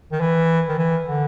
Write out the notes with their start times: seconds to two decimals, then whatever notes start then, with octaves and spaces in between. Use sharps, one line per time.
0.12 D#3
0.21 E3
0.69 D#3
0.78 E3
1.07 D3